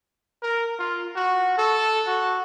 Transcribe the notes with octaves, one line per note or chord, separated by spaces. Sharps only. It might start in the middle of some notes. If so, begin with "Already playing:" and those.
A#4
F4
F#4
A4
F#4